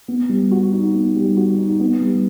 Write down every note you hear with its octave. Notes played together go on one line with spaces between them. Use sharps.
B3
G3
F#4
D#4
B3
G3
F#4
D#4
B3
G3